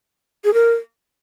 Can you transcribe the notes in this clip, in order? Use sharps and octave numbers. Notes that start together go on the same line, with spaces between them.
G#4
A#4